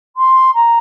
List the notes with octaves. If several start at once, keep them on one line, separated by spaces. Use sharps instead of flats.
C6
A#5